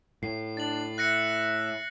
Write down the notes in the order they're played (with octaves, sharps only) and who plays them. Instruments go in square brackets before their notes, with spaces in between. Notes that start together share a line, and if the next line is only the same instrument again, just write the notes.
[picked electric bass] A2 [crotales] C7
[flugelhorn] D4 [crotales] A6 F#7
[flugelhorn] E5 [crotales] F#6 A#6 C#7